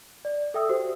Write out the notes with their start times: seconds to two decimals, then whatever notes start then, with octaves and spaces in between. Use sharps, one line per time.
0.25 D5
0.54 A4 E5 G5 D#6 E6
0.69 F#4 G4 C5